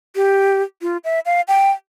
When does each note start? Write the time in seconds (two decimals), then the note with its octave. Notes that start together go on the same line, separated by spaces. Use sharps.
0.16 G4
0.82 F4
1.04 E5
1.26 F5
1.48 G5